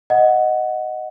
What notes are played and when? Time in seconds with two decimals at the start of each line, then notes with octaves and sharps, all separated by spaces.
0.10 D#5 F#5